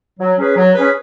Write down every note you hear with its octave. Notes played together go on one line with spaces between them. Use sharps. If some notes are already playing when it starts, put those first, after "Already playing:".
F#3
C#4 G#4 B4
F#3
C#4 G#4 B4